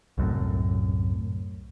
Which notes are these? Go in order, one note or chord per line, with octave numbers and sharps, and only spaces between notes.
C2 F#2 A2